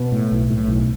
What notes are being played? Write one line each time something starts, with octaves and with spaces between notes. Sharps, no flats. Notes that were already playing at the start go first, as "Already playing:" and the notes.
Already playing: B2 B3
A2
B1
A2
B1